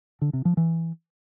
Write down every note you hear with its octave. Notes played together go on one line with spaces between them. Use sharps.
D3
C3
F3
E3